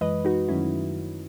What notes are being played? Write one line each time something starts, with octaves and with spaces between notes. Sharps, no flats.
F#2 E3 G#3 B4 D#5
D#4 F#4
F#2 D#3 F#3 A3 C#4 E4